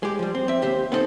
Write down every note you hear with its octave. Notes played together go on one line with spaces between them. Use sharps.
G#3 G4
F3 G3
C4
C4 E5
D#2 G4 C5
B3 C4 D#4 A4 C5